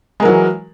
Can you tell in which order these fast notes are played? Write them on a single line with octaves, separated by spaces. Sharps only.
G#3 A#4 F#3 E3